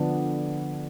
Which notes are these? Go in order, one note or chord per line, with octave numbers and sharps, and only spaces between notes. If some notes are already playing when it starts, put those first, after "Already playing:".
Already playing: D3 F3 B3 D4